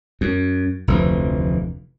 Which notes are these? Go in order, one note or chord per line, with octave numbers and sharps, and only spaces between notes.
F#2
F1 D2 E3 F3